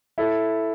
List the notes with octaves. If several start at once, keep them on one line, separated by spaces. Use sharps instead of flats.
E4 A4